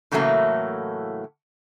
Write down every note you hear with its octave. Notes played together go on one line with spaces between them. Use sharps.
A2 C#3 E3 F#3 A3 A#3